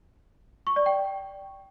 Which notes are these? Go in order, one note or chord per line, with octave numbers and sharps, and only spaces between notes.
C#6
D5
G5